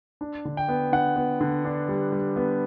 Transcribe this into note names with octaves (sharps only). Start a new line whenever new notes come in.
D4
D3
G5
B3
D3 F#5
B3
D3
D4
G3
G3
B3